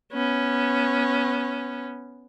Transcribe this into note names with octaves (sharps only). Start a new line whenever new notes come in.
B3 C#4